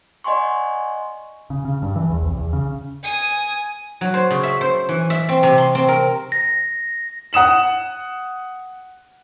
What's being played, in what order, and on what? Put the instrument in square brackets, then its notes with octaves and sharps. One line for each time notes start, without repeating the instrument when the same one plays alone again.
[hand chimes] D5 D#5 F#5 G#5 C6 C#6
[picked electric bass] C#3
C#3
G2
E3
E2
C2
E2
C#3
[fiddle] G#5 D#6
[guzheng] F#3
C5
C#3
E5
C5
E3
E5
C4
C3
C6
C4
A#4
[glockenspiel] A#6
[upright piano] F#5 D#6 E7 F#7